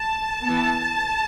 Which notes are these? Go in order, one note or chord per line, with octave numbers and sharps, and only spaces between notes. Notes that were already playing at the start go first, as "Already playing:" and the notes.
Already playing: A5
E3 B3